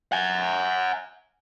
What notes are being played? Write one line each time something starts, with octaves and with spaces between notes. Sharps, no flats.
F#5 G#5